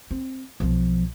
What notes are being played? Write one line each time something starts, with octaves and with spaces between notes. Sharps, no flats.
C4
B1 F3